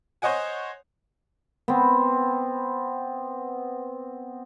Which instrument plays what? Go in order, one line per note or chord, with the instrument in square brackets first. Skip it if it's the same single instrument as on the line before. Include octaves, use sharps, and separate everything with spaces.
[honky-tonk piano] C5 C#5 D#5 F#5 G#5
[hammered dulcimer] B3 C4